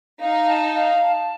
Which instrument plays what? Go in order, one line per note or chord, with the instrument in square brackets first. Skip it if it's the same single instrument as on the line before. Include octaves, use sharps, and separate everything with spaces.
[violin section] D#4 [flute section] F5
[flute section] A5
F5
A5